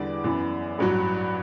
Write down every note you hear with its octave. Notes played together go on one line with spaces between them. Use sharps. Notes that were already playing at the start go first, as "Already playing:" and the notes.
Already playing: E2 D3 G3 D5
F#2 E3 B3
A1 G2 F#3